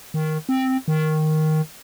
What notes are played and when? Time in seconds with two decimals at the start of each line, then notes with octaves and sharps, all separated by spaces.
0.14 D#3
0.49 C4
0.88 D#3